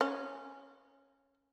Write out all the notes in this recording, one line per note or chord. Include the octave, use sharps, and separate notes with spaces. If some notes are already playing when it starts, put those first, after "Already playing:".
C#4